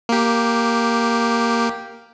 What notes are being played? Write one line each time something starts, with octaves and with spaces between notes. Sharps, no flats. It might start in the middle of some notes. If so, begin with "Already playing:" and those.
A#3 G4